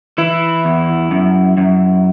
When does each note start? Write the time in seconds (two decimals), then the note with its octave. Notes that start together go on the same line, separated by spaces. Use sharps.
0.18 E3 E4
0.65 E2
1.11 F#2
1.57 F#2